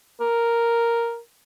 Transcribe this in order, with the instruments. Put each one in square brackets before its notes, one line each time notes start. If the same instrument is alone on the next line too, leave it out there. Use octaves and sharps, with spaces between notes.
[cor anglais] A#4